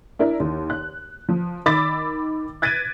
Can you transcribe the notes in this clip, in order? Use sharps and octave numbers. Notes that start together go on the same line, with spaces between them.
D4 E4 A#4
D#2
F#6
F3
D#3 B5 D6 E6 A6 B6
F#6 G#6 A6 B6 D7 D#7